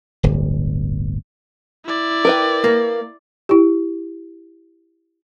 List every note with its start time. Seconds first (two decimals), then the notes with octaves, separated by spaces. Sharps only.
0.23 D1 G1
1.85 E4 D5
2.25 A#4 B4 G5
2.64 A#3
3.49 E4 G4